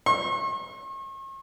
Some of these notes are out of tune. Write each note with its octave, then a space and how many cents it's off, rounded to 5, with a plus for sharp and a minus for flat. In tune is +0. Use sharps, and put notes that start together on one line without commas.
C#6 -45